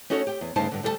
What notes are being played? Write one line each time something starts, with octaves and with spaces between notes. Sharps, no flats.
C#4 D#4 F#4 A4 A#4 C#5
G4 G5
E2
D2 G2 C#3 D#4 C5 A5
G2 D3
D2 G3 A4 F5 A5